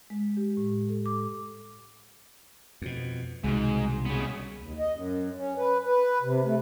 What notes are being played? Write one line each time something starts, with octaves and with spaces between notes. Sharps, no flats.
G#3
G4
A2
A4
D6
F2 B2
C2 G#2 B2 D#3
C#3 B3
D#2
D#5
F#2
C#4
B4
B4
C3
A3